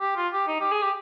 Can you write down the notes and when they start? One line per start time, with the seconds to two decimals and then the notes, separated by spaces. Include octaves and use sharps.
0.01 G4
0.17 F4
0.33 G4
0.48 D#4
0.60 G4
0.72 G#4
0.83 G4